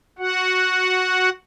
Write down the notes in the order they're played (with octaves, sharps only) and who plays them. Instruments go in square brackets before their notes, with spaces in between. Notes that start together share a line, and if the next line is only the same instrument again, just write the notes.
[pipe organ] F#4 F#5